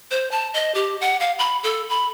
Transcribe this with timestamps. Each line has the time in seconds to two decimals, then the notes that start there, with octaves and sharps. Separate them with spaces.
0.11 C5
0.32 A5
0.54 D#5
0.75 G4
1.01 F#5
1.20 F5
1.39 B5
1.63 A4
1.90 B5